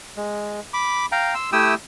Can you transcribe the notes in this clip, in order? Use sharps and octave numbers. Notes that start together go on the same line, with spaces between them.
G#3
B5 D6
F5 G5 A#5
C6 E6
A3 E4 G4 G5 D#6 E6